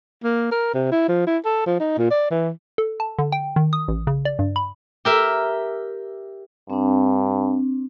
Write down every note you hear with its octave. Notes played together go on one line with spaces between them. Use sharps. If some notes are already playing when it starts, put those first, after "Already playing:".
A#3
A#4
C3
E4
F3
E4
A4
F3
D#4
A#2
D5
E3
A4
A5
D3
G5
D#3
D#6
A1
C#3
D5
G2
B5
G4 A#4 E5
G2 C4 D4